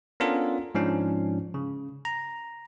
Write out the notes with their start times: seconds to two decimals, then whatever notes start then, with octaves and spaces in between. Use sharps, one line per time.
0.20 B3 C#4 D4 F4 A4 A#4
0.75 G#2 F3 C#4 D4
1.54 C#3
2.05 A#5